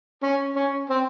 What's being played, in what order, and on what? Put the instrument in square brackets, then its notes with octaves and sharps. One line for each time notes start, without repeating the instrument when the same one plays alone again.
[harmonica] C#4
C#4
C4